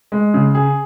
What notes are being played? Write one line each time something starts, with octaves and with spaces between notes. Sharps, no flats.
G#3
C#3
G#4